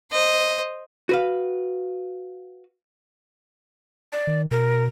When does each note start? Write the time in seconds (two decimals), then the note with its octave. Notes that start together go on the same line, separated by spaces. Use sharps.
0.11 C5 D#5
1.09 F#4 B4 F5
4.12 D5
4.27 D#3
4.51 B2 A#4